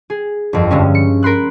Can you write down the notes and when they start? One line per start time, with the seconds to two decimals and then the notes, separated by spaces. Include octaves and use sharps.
0.10 G#4
0.53 G1 F2
0.71 G2 D3 G#3 C#4
0.95 C#7
1.23 A#4 B5 C6 F#6